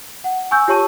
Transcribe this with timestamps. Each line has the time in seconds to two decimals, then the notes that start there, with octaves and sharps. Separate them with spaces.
0.24 F#5
0.51 G#5 C#6 E6 G6
0.68 F4 G4 C#5 A5 C#6 D#7